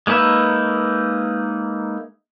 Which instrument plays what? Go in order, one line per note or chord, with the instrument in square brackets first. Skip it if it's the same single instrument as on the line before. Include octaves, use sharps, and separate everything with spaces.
[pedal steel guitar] G#3 A#3 D#4 B4 E5